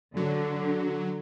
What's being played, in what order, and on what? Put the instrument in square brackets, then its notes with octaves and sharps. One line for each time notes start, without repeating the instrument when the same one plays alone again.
[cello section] D3 [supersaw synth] F#3